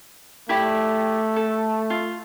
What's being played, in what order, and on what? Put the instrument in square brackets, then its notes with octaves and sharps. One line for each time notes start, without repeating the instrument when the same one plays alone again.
[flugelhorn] A3 [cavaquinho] E4 G4 D5
[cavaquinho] A4
F4